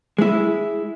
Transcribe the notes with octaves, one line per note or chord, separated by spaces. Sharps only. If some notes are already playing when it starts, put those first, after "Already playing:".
G#3 E4